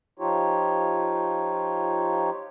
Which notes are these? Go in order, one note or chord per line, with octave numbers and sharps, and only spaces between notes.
F3 D#4 F4 G4 C#5